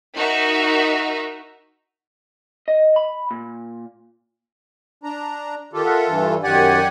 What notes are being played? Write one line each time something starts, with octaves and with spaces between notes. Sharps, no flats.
D#4 F#4 A#4 E5
D#5
B5
A#2
D4 A#5
D#3 F4 G4 A4
A#4 E5 F#5
G2 E3
F#2 D#3 G4 D5 F#5 G#5